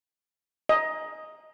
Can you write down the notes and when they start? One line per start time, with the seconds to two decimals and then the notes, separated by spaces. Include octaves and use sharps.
0.69 D#5